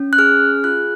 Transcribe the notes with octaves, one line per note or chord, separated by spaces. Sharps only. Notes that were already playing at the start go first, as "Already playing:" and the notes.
Already playing: C#4
F#6
G#4 F6
F4 F#6